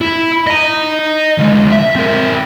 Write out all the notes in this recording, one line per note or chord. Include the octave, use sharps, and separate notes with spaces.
E4
D#5 A#5
D2 G#3
E5
C4 A#4